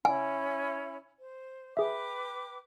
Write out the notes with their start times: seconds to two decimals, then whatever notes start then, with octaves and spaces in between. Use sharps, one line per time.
0.05 C#4 E4 G#5 B5
1.17 C5
1.77 G#4 B4 E5 G5 D6